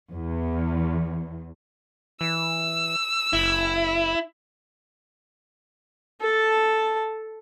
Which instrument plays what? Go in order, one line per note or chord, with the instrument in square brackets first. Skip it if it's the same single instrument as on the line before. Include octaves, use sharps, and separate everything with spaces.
[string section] E2
[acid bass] E3 [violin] E6
[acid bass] F#1 [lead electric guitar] E4
[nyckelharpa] A4 A5